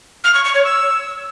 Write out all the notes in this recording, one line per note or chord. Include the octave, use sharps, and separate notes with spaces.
F6
C#6
C#6
C#5
E6